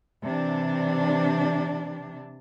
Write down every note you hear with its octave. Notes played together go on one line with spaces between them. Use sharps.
C3 E3 D4